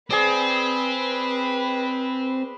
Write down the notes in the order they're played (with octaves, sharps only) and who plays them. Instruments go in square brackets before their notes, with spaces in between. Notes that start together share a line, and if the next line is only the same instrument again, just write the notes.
[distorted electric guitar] C4 [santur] G#4 D5 [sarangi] B4